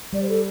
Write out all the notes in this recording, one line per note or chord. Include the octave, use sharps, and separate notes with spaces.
G3 D5
C5
A4